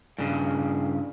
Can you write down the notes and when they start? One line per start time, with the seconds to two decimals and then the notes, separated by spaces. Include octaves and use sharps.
0.18 G2 C#3